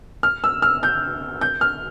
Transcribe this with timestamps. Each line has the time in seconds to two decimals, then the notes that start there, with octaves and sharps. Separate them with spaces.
0.23 F6
0.44 E6
0.62 F6
0.83 G6
1.41 G6
1.61 F6